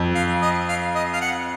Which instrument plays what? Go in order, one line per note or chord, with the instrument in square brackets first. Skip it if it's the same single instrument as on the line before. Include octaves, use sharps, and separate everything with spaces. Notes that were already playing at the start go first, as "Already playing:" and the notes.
Already playing: [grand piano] F2
[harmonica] F5
D#5
F5
D#5
F5
F#5